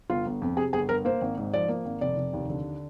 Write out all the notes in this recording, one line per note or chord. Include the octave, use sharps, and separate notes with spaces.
G1 F4
G1
F2
C3 G#4
G1 G#4
G1 A#4
A#3 C5
G#1
G#2
F3 D5
A#3
G#1
F1 D5
F1
D#2
D3